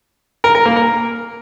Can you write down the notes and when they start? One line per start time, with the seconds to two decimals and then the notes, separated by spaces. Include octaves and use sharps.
0.44 A#4
0.55 A#4
0.65 A#3
0.76 A#4